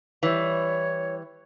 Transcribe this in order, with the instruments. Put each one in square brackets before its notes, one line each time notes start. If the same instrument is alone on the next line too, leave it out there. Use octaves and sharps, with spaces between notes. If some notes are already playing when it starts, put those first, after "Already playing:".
[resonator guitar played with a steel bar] E3 G3 [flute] C#5